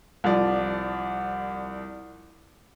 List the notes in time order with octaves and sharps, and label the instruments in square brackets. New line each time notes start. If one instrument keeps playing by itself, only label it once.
[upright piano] C2 F3 D5